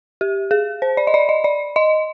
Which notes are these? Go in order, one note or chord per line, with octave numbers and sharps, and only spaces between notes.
G4
G#4
C5
D5
D#5
D5
D#5
D5
D#5